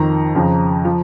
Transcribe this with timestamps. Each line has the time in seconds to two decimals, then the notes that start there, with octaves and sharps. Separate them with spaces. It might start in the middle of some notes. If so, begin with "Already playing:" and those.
Already playing: F2 D#3 A#5
0.35 F2 C#3 F3
0.85 F3